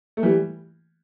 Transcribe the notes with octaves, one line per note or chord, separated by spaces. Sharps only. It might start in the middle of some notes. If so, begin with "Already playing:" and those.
A3
E3 G3